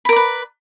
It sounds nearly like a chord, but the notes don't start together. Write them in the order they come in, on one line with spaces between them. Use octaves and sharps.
B5 A#4 D5 B4